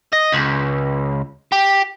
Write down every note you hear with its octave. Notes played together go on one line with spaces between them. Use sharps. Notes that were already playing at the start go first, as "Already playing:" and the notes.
D#5
C#2
G4